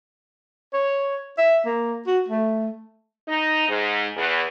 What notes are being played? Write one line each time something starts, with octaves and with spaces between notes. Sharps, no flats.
C#5
E5
A#3
F#4
A3
D#4
G#2
E2